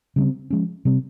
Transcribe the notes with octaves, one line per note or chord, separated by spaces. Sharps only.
C#3 G3 C4
F3 G#3 C#4
C3 G3 C4